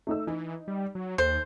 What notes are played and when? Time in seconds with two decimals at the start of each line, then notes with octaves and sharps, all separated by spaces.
0.07 A3 D#4 E6
0.27 E3 D#4
0.68 G3
0.95 F#3
1.18 D#2 A4 C5